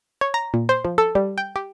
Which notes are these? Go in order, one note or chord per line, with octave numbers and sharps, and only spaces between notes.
C#5
A#5
A#2
C5
F3
A4
G3
G5
G4